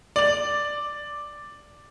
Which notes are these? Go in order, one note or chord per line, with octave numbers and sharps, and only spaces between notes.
D5 F#7